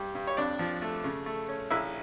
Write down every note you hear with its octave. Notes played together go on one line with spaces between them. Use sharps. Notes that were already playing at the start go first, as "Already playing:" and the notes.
Already playing: G2 G3 G4
G2
C#5
F2 D4 D5
F3
A3
C#3
A3
C#4
A#1 E4 E5